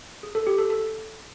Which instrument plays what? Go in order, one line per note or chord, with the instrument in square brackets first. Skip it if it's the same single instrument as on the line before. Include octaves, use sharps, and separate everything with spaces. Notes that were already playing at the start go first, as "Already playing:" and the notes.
[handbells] G#4
A4
G4
A4
A4